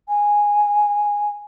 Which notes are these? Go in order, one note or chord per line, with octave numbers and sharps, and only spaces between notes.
G#5